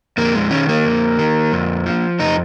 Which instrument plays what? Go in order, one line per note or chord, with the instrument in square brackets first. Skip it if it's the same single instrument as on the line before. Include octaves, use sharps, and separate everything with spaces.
[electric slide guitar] F2 A#3
G#3
D#3 C#4
A#3
F2
D#3
F2
F3
F2 D#4